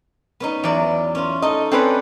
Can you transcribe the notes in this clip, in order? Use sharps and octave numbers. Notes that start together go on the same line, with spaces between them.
B3 C#4 D#4
E2 F#3 D5
C#4 F4
D#4 A4 D#5
C4 C#4 A4 B4 D5 F#5